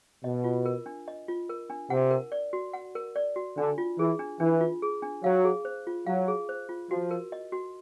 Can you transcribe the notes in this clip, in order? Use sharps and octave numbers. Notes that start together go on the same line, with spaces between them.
B2 D#5
F4
A#4
D4
D#5
F4
A#4
D4
C3 F#5
A#4
D5
F#4
F#5
A#4
D5
F#4
D3 D4
F4
E3 G#4
D4
E3 D4
F4
G#4
D4
F#3 F5
G#4
C5
F4
F#3 F5
G#4
C5
F4
F3 F#4
A#4
D#5
F#4